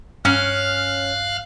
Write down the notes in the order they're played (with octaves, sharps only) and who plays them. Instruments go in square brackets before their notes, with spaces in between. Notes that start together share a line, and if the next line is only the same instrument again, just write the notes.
[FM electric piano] G2 [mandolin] C#4 [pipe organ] F5 F6 F#6